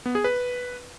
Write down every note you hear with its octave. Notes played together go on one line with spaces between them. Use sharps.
B3
G#4
B4